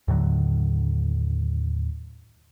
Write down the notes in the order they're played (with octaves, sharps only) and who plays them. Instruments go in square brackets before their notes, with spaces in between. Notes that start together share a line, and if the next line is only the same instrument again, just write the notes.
[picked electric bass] D#2 A2 D3 F#3